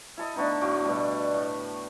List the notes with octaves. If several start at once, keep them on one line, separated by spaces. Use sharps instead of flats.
E4 A4 D#5
D3 A3 B3 D#4
A2 A3 F#4 D6
B2 G3
A2